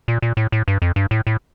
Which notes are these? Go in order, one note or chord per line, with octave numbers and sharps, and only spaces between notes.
A#2
A#2
A2
A2
G2
F2
G2
A2
A2